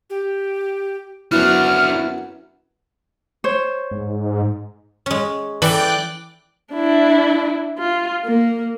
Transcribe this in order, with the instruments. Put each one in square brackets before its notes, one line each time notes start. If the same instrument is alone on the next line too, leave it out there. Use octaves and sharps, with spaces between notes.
[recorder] G4
[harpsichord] F#2 F#3 B3 [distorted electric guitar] D4 F#4 [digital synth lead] E4 [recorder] F6
[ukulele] C5 C#5
[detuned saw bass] G#2
[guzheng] G#3 C#4
[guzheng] E3 A4 [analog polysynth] D5 G5 F#6
[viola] D4 E4
F4
A#3